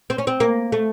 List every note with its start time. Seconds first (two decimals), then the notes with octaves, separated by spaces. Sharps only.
0.10 C4
0.18 C#4
0.27 C4
0.40 A#3
0.72 A3